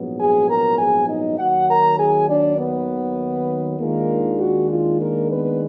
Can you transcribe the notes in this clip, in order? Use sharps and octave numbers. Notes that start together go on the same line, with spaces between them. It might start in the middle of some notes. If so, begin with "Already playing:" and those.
Already playing: A#1 G#2 F#3 B3
G#4 G#5
A#4 A#5
G#4 G#5
D#4 D#5
D#2 D#3 F#3 F#4 F#5
A#4 A#5
G#4 G#5
D4 D5
B3 B4
D#2 D#3 G#3 A#3 D4 F4 A#4
F#4
F4
A#3 A#4
B3 B4